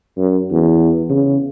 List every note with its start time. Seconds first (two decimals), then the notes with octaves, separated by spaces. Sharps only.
0.18 F#2
0.52 E2
1.10 C#3